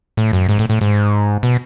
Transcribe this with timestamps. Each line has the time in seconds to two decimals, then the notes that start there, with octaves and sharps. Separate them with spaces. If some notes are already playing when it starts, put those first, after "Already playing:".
0.17 A2
0.33 F#2
0.49 G#2
0.59 A2
0.70 A2
0.81 G#2
1.43 B2